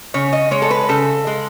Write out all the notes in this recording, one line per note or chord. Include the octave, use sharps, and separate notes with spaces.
C#3 C#5
D#5
G#3 C#5
A4
B4
C#3 A4
G#3